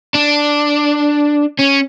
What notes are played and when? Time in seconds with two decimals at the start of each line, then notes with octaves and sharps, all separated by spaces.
0.14 D4
1.59 C#4